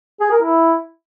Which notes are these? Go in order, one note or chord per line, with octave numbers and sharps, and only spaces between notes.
G#4
A#4
E4